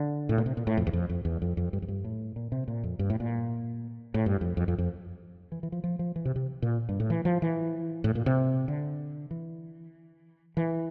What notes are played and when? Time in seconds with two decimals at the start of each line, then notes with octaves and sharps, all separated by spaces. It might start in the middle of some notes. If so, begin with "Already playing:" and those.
Already playing: D3
0.29 A2
0.38 A#2
0.46 C3
0.57 A#2
0.67 A2
0.77 F2
0.87 E2
0.93 F2
1.09 F2
1.25 E2
1.42 F2
1.57 F2
1.73 G2
1.82 F2
1.88 G2
2.04 A2
2.36 A#2
2.52 C3
2.68 A#2
2.83 F2
2.99 G2
3.10 A2
3.20 A#2
4.14 A2
4.26 G2
4.41 F2
4.57 F2
4.68 F2
4.78 F2
5.52 E3
5.63 E3
5.72 F3
5.84 F3
5.99 F3
6.16 E3
6.25 C3
6.36 C3
6.62 A#2
6.89 G2
7.00 A2
7.10 E3
7.25 F3
7.42 E3
8.04 A2
8.15 A#2
8.26 C3
8.68 D3
9.31 E3
10.57 E3